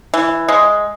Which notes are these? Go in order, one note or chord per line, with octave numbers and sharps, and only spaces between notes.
E3
G#3